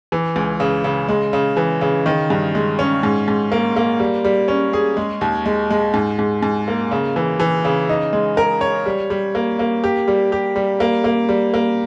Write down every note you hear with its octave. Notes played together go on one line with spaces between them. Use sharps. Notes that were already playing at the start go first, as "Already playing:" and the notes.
E3
C#2
C#3
C#3
G#3
C#3
E3
C#3
D#3
G2
G#3
C#4
G#2
G#2
A#3
A#3
G3
G3
C#4
G#4
G#3
D#2
G#3
G#3
G#2
G#2
G#2
A#3
C#3
E3
E3
C#3
D#4
G#3
A#4
C#5
G3
G3
A#3
A#3
G4
G3
G4
G3
A#3
A#3
G3
A#3